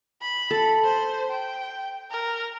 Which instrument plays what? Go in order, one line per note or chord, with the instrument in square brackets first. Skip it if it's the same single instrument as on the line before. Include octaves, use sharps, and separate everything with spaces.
[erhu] B5
[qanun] A4
[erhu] C5
G5
A#4